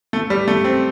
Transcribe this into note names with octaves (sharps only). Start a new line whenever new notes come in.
A3
G3
A3
C4